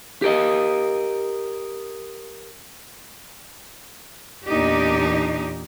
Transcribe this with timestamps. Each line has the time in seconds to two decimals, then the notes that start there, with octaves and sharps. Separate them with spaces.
0.22 G4 A#4 D#5
4.47 E2 A#2 D4 D#4 G4